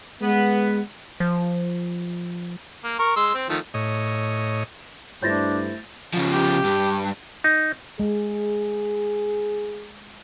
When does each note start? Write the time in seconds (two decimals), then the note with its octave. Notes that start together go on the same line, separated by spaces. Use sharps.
0.22 G#3 B3
1.20 F3
2.84 A#3
2.99 A#4 C#6
3.16 G#3 C6 E6
3.34 C4
3.49 D#3 F3 A3
3.74 A2 C#5 D#5
5.22 G2 A3 D4 E4 C5 G6 A6 A#6
6.14 C#3 F3
6.32 G4
6.64 G2
7.44 D#4
8.00 G#3 G#4